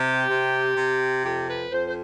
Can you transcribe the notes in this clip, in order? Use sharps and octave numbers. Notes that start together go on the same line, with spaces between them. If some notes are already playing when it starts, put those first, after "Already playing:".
Already playing: C3 G4
C3
C3
F2 G4
B4
F2 C5
C5